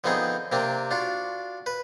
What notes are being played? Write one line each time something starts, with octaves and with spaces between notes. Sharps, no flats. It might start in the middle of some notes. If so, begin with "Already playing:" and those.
D3 F3 B3 C4 D#4 G#4
C3 A#3 C4 D4
D4 F4 F#4
B4